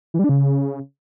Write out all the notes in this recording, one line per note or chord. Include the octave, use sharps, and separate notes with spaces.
E3
G3
D4
C#3